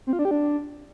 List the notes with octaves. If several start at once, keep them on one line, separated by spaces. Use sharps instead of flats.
C4
F4
D4
G4
D4